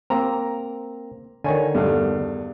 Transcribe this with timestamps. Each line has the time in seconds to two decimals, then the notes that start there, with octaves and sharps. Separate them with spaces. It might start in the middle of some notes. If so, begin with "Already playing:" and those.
0.10 A#3 C4 A#5
1.44 D3 D#3 C#5 G#5
1.75 E2 G2 A3